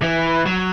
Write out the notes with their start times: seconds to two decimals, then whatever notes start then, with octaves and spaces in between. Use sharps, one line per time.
0.02 E3
0.46 F#3